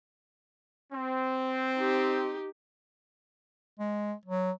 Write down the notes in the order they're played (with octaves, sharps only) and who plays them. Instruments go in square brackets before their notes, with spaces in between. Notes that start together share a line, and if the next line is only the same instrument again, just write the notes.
[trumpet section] C4
[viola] D#4 G4
[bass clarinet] G#3
F#3